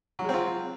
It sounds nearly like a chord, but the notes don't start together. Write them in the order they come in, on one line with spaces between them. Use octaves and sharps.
F#3 G#3 C4 F4